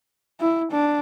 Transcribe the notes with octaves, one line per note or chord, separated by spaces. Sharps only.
E4
D4